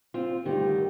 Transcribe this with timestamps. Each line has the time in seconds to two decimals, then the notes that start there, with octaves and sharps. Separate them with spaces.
0.14 C4 F4
0.46 D2 G2 D#3 G4